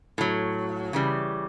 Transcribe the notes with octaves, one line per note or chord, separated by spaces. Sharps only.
A2 F#3
C#3 E3 G3